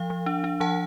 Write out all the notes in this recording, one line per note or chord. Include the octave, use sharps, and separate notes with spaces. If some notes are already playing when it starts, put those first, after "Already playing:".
Already playing: F3 F5
F3
D4
D4
F3 F#5 A5